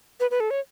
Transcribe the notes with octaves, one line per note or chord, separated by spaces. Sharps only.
B4
B4
A4
C#5